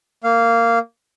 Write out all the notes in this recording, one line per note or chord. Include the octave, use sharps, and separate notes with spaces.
A#3 F5